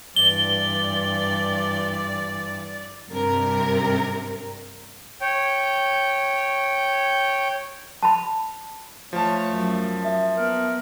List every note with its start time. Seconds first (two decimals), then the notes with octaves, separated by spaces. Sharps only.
0.16 G2 E3 D5 G7
3.09 G2 C3 A#4
5.20 C#5 G5
8.03 A5 B5
9.13 F3 A3 C#5 A5
9.54 F#2
10.05 E5
10.36 B3 A#4